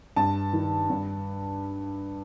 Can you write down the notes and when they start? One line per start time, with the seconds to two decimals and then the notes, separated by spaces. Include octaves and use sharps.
0.16 G2 A5
0.53 D#3
0.90 G2